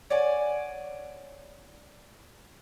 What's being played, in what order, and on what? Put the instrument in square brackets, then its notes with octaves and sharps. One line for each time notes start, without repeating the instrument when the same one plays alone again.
[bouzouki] C#5 D5 F#5 G#5